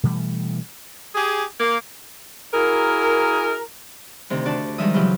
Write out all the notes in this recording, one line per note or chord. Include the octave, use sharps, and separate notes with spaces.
B2 E3 G3 A3
G4 G#4
A#3
E4 F#4 G#4 A#4
D2 C3 D#3
D4 F#4 D5 A5
D#3 F3 G3 G#3 E5 D#6
C#3 E3 F#3 E4 F4 G4